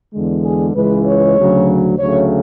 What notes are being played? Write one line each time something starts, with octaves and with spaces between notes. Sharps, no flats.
E2 D3 G#3
G#4
C#2 C#3 E3 G#3 B4
C#5
D2 C#3 F#3
D2 C#3 F#3 A3 C#5